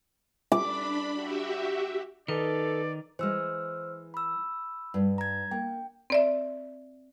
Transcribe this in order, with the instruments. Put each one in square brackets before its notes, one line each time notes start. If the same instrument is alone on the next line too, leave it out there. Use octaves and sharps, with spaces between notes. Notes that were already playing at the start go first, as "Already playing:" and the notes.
[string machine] D4 B5 [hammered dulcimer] D6
[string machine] F#4 G4 E5
[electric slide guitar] D#3 D#4 [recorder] A4 [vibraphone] B4 [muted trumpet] D5
[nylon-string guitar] E3 G#3 [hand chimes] C5 E6 F6
[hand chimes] B5 E6
[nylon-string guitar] G2
[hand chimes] A#5 G#6
[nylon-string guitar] A#3 [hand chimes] G5
[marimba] C4 D5 E5